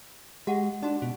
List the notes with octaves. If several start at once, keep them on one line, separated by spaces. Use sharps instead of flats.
G#3 F#4 G4 F#5
D4 D#4 F#4
B2